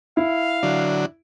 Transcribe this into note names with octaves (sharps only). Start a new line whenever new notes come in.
E4 F5
D3 F#3 D4